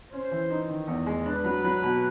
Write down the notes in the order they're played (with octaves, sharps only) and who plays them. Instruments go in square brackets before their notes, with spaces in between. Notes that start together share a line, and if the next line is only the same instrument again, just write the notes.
[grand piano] C#4 [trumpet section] C5
[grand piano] E3
D#4
D#3
E2
G#3
[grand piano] D4 [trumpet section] B4
[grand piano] F#3
F#3
B2